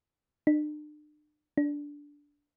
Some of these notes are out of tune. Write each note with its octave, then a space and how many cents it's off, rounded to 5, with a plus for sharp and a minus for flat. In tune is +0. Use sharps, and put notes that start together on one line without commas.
D4 +40
D4 -15